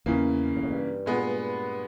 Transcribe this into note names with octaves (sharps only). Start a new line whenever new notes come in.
E2 C#3 E3 A#3
G2
G#2
G2
A#2 G#3 B3